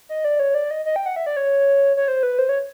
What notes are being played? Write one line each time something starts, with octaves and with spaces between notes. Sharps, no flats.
D#5
D5
C#5
D5
D#5
D#5
G5
F#5
E5
D5
C#5
C#5
C5
B4
C5
C#5